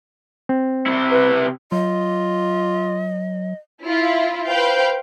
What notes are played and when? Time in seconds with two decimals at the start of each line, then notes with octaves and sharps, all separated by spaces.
0.49 C4
0.86 C3 E4
1.11 B4
1.72 F#3 F4 D#5
3.84 E4 F4
4.46 B4 C5 F5 G5 G6